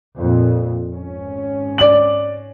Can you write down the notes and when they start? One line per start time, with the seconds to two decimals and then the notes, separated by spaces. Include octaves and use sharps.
0.18 F2 A#2
0.93 G#1 C#4
1.78 D5 F#7